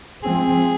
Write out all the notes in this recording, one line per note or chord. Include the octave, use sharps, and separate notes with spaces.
F3 G#3 C4 G#4